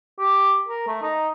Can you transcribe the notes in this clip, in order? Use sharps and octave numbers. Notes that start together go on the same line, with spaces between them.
G4
A#4
A3
D#4